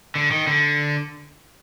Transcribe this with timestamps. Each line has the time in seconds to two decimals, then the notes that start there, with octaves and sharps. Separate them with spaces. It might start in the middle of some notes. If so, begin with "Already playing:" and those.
0.15 D3
0.31 D#3
0.47 D3